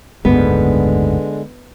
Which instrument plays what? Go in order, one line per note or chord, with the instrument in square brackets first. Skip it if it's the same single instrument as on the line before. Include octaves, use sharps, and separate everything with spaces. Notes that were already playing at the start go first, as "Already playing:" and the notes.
[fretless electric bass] F#1 D2 G#2 [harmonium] D3 G#3 [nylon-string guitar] B3